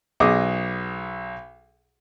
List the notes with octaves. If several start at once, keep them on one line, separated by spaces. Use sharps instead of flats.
B1 G#4 D#5 D6